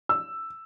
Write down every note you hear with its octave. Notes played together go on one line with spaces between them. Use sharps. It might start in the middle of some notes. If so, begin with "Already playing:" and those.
E6